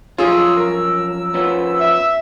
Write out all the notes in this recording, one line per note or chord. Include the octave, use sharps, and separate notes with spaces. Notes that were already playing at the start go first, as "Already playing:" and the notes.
F3 F#3 C#4 F4 G#4 E6
A#4
F3 B3 C#4
E5